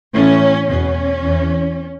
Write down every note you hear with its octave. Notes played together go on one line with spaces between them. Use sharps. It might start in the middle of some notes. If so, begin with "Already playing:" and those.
A2 E3 C#4
E2 B2 C#4
E2 E3